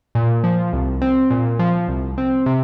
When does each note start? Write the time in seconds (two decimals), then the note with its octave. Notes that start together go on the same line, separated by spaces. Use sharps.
0.15 A#2
0.44 F3
0.73 C2
1.02 C4
1.30 A#2
1.59 F3
1.88 C2
2.18 C4
2.46 C3